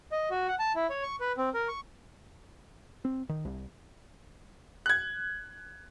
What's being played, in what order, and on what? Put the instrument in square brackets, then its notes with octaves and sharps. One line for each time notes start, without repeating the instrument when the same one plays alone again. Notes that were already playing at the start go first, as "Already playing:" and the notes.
[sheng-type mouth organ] D#5
F#4
F#5
A5
E4
C#5
C#6
B4
C4
A#4
C#6
[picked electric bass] C4
D#3
C2
[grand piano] F#6 G#6